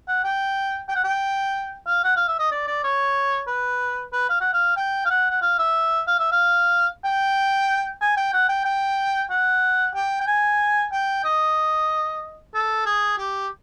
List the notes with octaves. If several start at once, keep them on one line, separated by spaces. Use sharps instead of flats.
F#5
G5
G5
F#5
G5
F5
F#5
F5
E5
D#5
D5
D5
C#5
B4
B4
F5
F#5
F5
G5
F5
F#5
F#5
F5
E5
F5
E5
F5
G5
G#5
G5
F#5
G5
G5
F#5
G5
G5
G#5
G5
D#5
A4
G#4
G4